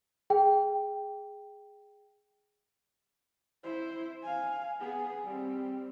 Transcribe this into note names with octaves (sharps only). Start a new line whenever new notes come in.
G#4 G5
E4 C5
F5 G#5
B3 G#4
G3 C4